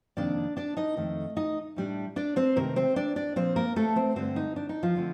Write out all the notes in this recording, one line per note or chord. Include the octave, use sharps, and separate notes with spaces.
F2 C3 D#3 A#3 D4 D5
D4 D5
D#4 D#5
F2 D#3 A3
D#4 D#5
A2 G3 D4
D4 D5
C4 C5
C3 D#3 A3 A#3 A#4
C4 C5
D4 D5
D4 D5
A#2 F3 A#3 C4 C5
A#3 A#4
A3 A4
C4 C5
G2 D3 A3 C4 D4 C5
D#4
D4
D#4
F3 F4
D3 F3 A3 C4